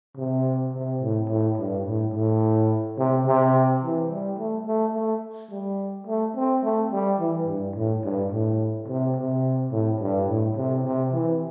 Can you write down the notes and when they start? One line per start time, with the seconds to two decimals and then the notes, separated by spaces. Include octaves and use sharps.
0.17 C3
0.73 C3
1.01 A2
1.29 A2
1.57 G2
1.85 A2
2.13 A2
2.98 C3
3.26 C3
3.82 E3
4.10 G3
4.38 A3
4.67 A3
4.95 A3
5.51 G3
6.07 A3
6.36 C4
6.63 A3
6.91 G3
7.19 E3
7.47 G2
7.76 A2
8.04 G2
8.32 A2
8.88 C3
9.16 C3
9.72 A2
10.00 G2
10.28 A2
10.56 C3
10.84 C3
11.13 E3